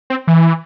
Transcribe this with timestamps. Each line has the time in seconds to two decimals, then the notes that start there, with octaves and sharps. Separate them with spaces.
0.10 C4
0.28 E3